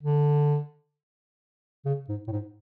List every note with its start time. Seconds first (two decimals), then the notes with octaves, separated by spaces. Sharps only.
0.03 D3
1.86 C#3
2.09 G#2
2.28 A2
2.32 G#2